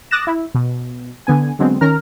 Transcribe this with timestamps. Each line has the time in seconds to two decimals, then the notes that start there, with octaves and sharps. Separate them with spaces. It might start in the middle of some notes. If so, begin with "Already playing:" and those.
0.11 D6 D#6 F#6 A6 A#6 E7
0.27 E4
0.55 B2
1.27 D3 B3 G#5
1.59 D3 F#3 G#3 B3 C4
1.81 D#3 C#4 A#4 A#5 F6